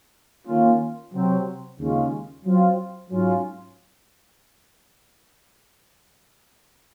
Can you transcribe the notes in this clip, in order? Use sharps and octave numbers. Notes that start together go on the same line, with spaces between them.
D#3 A#3 C#4 F4
C3 F#3 C4
D#2 C#3 G#3 C#4 F4
F#3 C4 F4
G#2 F#3 C#4 F4